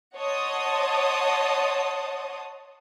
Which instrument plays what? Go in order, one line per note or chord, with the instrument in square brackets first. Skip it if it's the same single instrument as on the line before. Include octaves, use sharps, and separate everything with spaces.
[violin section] C#5 D#5 F#5 A5 C6 D#6